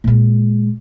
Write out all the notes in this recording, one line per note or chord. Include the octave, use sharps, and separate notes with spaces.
A#2 G#3